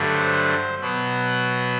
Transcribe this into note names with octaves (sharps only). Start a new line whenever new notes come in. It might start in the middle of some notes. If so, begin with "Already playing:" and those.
Already playing: G2 D3 F#3 A3
C5
B2 F#3 B3